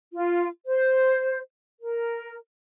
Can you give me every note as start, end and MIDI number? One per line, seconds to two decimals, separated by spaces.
0.13 0.47 65
0.66 1.38 72
1.81 2.36 70